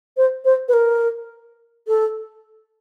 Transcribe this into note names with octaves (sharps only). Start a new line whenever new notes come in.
C5
C5
B4
A#4
A4